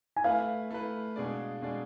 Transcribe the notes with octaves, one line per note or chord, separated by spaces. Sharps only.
G#5
A3 E4 B4 F5
A3 E4 B4
B2 G#3 D4 G#4 D5
B2 G#3 D4 G#4 D5